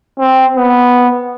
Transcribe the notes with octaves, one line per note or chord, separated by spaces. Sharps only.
C4
B3